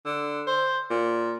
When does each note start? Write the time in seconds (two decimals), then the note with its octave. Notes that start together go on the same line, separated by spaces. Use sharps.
0.05 D3
0.47 C5
0.90 A#2